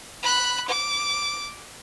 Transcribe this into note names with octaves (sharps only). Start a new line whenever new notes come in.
B5 F#6
D6